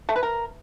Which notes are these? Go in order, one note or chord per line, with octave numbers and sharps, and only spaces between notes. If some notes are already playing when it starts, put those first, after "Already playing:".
A3
B4
A#4